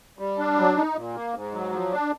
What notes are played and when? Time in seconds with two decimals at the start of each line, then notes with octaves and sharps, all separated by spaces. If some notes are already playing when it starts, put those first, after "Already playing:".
0.19 G3
0.39 D4
0.58 F#3
0.77 D#4
0.96 A#2
1.14 A#3
1.34 G#2
1.53 F#3
1.72 F3
1.92 D4